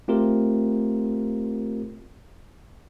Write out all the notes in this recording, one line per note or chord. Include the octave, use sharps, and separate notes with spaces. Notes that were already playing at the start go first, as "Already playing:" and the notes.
A3 C4 F4 G4 A#4